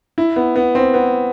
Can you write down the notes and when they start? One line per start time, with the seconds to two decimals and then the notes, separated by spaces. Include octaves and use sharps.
0.18 E4
0.36 B3
0.55 B3
0.75 C4
0.94 B3